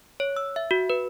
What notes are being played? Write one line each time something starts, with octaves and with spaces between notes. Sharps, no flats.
C#5
E6
E5
F#4
B4